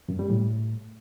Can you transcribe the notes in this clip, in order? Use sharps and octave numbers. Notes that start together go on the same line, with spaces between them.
F#2
G3
A2